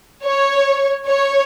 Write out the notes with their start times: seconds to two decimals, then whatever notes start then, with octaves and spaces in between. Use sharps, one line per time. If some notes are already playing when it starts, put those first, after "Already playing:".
0.24 C#5
1.06 C#5